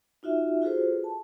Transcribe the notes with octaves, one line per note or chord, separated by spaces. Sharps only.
D#4 F4 F#4 E5
F4 F#4 G#4 A4 B4 C5
A5